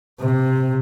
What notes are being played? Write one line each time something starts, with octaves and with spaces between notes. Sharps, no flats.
C3